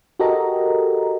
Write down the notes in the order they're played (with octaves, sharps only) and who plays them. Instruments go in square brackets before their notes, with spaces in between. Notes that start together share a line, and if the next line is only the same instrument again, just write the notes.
[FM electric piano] F#4 G4 A4 A#4 D#5 A#5